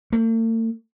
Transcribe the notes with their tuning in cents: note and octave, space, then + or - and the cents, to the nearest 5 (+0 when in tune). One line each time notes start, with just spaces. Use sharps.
A3 +45